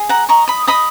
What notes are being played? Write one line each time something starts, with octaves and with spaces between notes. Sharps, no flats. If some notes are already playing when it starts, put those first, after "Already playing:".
Already playing: G#4
F#5 A#5
D#5 A#5 C#6
B5 D#6
D#5 B5 D#6